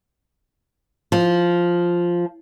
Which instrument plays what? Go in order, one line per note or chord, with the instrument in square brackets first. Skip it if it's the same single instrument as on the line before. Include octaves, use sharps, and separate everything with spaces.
[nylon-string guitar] F3